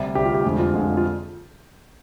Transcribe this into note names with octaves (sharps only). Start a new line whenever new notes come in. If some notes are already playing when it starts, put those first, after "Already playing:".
Already playing: D2 C3 G3
D2 C3 G3 G4
F4
G4
F2 D3 G#3 F4
F4
F2 D3 G#3 F4
F4